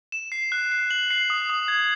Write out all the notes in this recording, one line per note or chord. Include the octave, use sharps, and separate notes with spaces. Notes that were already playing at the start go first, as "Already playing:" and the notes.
E7
C7
F#6
C7
F#7
C7
D#6
D#6
G#6